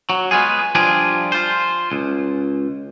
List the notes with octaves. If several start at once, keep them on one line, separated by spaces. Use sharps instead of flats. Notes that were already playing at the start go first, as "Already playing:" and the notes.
F#3
G#3 B3 F4 G#4
F3 G3 D4 F4 G#4
F4 C5
C#2